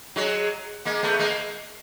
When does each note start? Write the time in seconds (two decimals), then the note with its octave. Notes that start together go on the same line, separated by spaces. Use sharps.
0.16 F#3 G#3
0.85 G#3 A#3
1.03 A3 B3
1.19 G#3 A#3